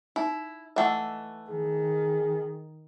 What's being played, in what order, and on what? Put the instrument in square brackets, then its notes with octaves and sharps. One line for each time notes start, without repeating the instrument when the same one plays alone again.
[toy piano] D#4 [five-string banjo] E4
[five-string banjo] E3 A3 [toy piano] D#5 F#5 E6
[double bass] D#3 [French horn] G#4